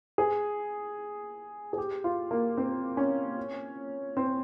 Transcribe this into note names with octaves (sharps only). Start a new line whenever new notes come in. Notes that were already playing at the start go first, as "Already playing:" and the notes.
G#4
G#4
G4
F4
A#3
C4
C#4
C4